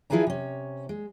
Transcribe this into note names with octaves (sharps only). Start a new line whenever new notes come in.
F3 E4 G#4 B4 G#5 A#5
C3 C#4
G#3